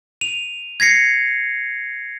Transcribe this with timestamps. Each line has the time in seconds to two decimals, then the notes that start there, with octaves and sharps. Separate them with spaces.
0.21 D#7 F7
0.80 G#6 A#6 C7 C#7